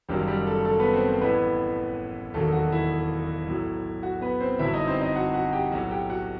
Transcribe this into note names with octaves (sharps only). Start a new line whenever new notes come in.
F#1 F#2 D#3 F#3 G3 G4
G3 G4
A3 A4
A3 A4
B3 B4
C4 C5
C4 C5
A1 A2 E3 B3 B4
E1 D#2 D#3 F#3 A3 A4
F#4
E4
B1 A2 F#3
F#4
B3 B4
C4 C5
G1 F#2 F#3 E4 E5
D#4 D#5
C4 C5
D#4 D#5
F#4 F#5
F#4 F#5
G4 G5
B1 A2 F#3 F#4 F#5
G4 G5
F#4 F#5